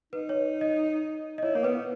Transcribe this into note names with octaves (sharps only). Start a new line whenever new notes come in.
D#4 B4
C#5
D#5
D#5
E4 C#5
A#3 C#5
B3 B4